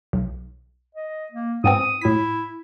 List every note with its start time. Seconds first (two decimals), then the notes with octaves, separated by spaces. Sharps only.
0.13 B1
0.95 D#5
1.32 A#3
1.64 G#2 B3 C4 D#6
2.01 A2 E4 B6